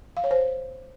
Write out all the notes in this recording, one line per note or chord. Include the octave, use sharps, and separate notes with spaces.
F5
C#5
C5